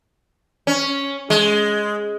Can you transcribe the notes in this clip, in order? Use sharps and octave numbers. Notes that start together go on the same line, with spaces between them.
C#4
G#3